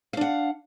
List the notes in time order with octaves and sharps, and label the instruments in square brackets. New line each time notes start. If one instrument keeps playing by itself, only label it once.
[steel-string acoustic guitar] F5
D4
F#5